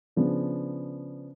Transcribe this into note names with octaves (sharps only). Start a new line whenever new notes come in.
C#3 F3 B3 D4